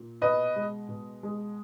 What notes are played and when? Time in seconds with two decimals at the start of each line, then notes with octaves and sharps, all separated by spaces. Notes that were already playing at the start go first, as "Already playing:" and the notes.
Already playing: A#2
0.22 B2 B4 D#5
0.56 G#3
0.89 B2
1.23 G#3